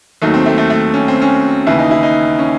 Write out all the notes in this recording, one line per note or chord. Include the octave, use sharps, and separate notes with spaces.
D#2 D#3 F#3 A3
C4
A3
A3
A3
C#4
C4
C#4
D#2 C#3 E3 E4
D#4
E4
D#4
C#4